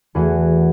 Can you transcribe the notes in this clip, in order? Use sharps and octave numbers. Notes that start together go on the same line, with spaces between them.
E2 E3 A3 F#4